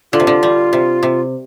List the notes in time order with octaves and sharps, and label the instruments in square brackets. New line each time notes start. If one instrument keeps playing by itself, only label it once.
[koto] D3 [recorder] F4
[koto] C3
D3
G3
C3
C3